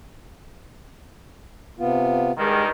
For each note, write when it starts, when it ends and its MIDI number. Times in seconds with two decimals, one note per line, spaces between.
1.79 2.32 48
1.79 2.32 59
1.79 2.32 65
2.38 2.70 43
2.38 2.70 51
2.38 2.64 56